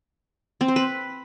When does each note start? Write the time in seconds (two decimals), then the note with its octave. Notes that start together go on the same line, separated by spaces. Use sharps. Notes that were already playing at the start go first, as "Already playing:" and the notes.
0.61 C4
0.68 C5
0.76 B4